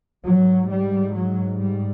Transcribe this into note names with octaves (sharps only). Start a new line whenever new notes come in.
G#2 F#3
G3
F#3
G3